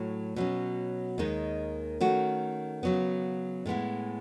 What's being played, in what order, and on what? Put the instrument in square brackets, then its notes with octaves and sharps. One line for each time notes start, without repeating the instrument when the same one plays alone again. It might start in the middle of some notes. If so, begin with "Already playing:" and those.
Already playing: [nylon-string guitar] A2 F#3 A3
B2 F#3 C#4
D#2 D#3 G#3 D#4
D#3 A3 C#4 F#4
C#3 F#3 B3
A2 G#3 B3 E4